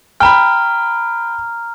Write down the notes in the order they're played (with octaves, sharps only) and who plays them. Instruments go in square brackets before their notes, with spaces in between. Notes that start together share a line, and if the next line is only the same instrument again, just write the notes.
[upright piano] G5 B5 [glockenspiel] A#5 F6